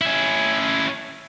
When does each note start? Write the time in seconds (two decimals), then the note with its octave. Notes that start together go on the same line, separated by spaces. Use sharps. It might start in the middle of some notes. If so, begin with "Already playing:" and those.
0.01 C#4 E4